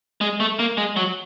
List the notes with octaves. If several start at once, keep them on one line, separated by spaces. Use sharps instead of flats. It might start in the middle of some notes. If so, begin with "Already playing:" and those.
G#3
A3
A#3
G#3
F#3